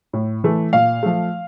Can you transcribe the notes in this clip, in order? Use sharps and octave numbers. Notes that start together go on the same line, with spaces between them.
A2
E3 A3
A#2 F5
F3 A3